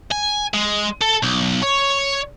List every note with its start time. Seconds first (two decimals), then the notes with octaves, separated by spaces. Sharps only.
0.12 G#5
0.54 G#3
1.02 A4
1.23 B1
1.63 C#5